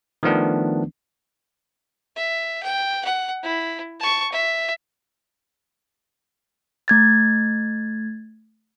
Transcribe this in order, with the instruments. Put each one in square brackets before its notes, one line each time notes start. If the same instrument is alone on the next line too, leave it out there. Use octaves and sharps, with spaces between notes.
[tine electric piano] D#3 F3 A3 B3 D4
[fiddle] E5
G5
F#5
E4
A5 C#6
E5
[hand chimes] A3 G#6 A6